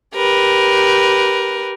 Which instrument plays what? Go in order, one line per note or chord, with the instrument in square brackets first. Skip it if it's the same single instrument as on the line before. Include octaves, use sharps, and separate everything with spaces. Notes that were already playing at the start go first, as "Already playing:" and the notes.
[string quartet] G4 A#4 B4